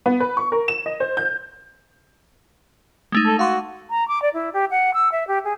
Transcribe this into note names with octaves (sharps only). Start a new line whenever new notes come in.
B3
B4
C#6
A#4
E7
D#5
C5
G6
G#3 A3 D#4
A4
F#4 F5 C6 D6
A#5
D6
D5
E4
G4
F#5
E6
E5
G4
G#4